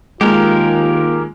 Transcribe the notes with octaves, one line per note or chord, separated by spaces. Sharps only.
D#2 G#3 A#3 F4 G4 A#4